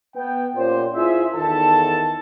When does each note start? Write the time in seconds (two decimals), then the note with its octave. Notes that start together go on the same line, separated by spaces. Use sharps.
0.16 B3 G5
0.56 A#2 C#4 G4 C5
0.96 E4 F4 G#4 C5 E5
1.36 E2 D#3 A4 A5